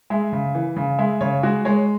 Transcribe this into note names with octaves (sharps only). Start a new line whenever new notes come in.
G#3 E5
C#3
E3
C#3
G#3 E5
C#3 C#5
G#3 F#4
G#3 C#5